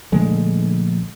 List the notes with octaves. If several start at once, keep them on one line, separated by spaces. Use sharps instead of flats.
A#1 D3 G#3 A3